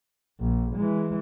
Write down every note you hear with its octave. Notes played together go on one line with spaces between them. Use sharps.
A#1
E3 G#3